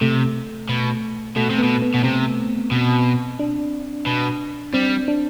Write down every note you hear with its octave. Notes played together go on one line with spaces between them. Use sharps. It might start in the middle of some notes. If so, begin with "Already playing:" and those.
C3 A3
B2
B2 A3
C3
B2 B3
B3
B2
C3 C4
B2
D4
B2
G3 C4
D4